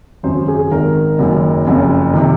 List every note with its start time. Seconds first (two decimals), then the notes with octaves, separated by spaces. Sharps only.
0.23 G#1 F#2 C#3 C5
0.48 G#4
0.71 G#1 G#2 D#3 A#4
1.19 F#1 F#2 D#3
1.67 F#1 F2 C#3
2.13 C3 D#3